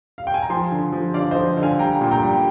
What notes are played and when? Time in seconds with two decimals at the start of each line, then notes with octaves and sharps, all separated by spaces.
0.18 F5
0.27 G5
0.34 G#5
0.42 A#5
0.50 F3 G#5 C6
0.72 D3
0.93 F3
1.14 D3 D5 F5
1.31 F3 C5 D#5
1.57 D3
1.63 F5 G#5
1.79 G3 G5 A#5
2.01 A#2
2.11 G5 A#5
2.23 G3